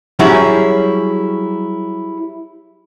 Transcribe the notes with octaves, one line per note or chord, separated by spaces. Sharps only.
F#3 G3 C#4 E4 F#4 G#4